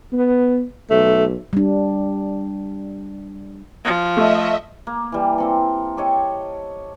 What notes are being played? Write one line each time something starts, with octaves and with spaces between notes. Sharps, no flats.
B3
B1 A3
G3 D4
F3
A3 D#5 E5
A#3
E3 G3
A#3 C4 A4
G4 A4 C#5 D#5